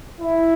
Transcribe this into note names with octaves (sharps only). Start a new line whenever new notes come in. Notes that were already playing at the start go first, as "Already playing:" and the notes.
E4